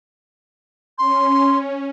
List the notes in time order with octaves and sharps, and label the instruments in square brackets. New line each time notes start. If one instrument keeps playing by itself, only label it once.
[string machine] C#4 [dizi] C6